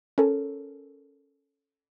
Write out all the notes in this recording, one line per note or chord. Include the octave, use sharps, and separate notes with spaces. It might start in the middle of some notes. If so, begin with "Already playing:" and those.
C#4 A4 A#4